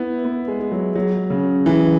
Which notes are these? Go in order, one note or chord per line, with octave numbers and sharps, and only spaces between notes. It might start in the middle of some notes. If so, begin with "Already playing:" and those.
Already playing: B3 E4
B3
G#3
G#3
F#3
F#3
C#3
E3